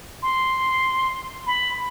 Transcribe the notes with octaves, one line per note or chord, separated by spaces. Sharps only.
C6
B5